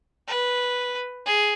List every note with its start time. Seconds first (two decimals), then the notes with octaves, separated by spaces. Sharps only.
0.27 B4
1.25 G#4